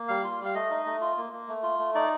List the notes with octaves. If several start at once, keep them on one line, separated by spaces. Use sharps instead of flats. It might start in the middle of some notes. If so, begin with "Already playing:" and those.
Already playing: A#3
G3 F5
F4
G3 F5
A3 D#5
D#4
A3
F4
A#3
A#3
A3
F4
A3
D#4 D5